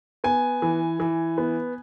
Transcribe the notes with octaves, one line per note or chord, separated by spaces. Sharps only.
B3 G#5
E3
E3
B3